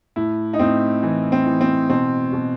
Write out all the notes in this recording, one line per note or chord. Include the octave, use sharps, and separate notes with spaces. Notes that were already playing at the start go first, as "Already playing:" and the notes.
A2 E4
D#4
A2 C4
E3
C4
E3
C4
B2 C4
B2